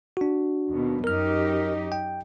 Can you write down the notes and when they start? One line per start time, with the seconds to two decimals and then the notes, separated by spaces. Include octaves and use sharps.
0.17 D4 F#4
0.71 D#2 B2
1.04 F#2 D#4 G4 A#4 F6
1.92 G5